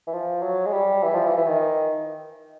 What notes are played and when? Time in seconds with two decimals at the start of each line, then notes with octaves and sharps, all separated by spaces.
0.07 E3
0.13 F3
0.42 F#3
0.66 G#3
0.73 G3
1.02 E3
1.14 F3
1.26 E3
1.37 E3
1.48 D#3